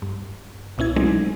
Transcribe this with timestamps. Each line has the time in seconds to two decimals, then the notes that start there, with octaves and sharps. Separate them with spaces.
0.02 G2
0.78 C2 B2 C#4 E4 G#6
0.96 F#3 G#3 A3 C4 D4 D#4